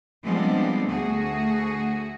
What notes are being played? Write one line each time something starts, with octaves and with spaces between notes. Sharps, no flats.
F3 G3 G#3 B3 C4 D4
D2 A3 F#4 G#4